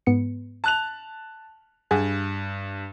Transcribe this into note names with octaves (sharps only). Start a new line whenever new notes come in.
G#2 B3 C#7
A5 F#6 F7
G2 G#4 F#5 G#5